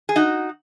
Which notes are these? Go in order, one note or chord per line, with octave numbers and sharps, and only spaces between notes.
G#4
D#4 F#4